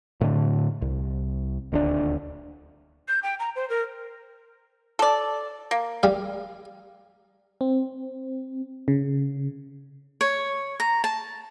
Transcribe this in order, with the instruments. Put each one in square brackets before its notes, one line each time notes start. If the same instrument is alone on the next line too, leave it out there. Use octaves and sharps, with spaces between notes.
[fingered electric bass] A2 D3
C2
D#1 D2 D4
[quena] G6
G5
A#5
C5
A#4
[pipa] A4 D5
A#3
[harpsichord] G3 F5
[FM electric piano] C4
C#3
[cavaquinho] C#5
A#5
A5